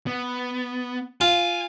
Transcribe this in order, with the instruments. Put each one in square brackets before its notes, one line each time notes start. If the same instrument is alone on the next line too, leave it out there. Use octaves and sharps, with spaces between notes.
[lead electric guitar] B3
[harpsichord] F4 [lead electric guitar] G#5